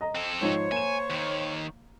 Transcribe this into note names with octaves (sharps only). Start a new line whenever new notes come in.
D#5 A#5
C4 A4
G#2 F3 D#4 C5 C#5
A#3 G#5 E7
D#2 D#3